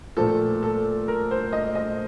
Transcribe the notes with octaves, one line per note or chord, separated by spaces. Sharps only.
A#2 F3 A3 C4 A4
A4
A#4
C5
D#5
D#5